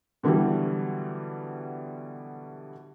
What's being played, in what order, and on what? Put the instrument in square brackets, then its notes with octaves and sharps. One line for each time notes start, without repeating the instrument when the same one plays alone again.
[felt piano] B2 D3 E3 F#3 G3